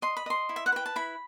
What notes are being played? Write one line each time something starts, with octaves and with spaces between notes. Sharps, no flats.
D#5 C6
B5
D#5 C6
E4
E5
F#5
B4 G5
A5
E4 B5